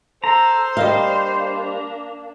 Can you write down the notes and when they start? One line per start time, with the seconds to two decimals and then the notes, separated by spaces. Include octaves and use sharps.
0.24 A4 C5 A#5
0.77 G3 A#3 D4 D#5 F5